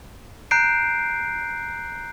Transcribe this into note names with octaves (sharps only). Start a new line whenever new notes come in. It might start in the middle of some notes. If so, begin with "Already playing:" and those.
A#5 F#6 G6 C7 D7